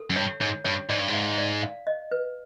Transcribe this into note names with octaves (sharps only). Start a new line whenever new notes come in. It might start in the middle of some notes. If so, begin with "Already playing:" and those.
Already playing: A4
F#2
G2 C#5
G#2 C#5
G2 C#5
G#2 D5
G2
G#2
F5
D5
F5
D#5
B4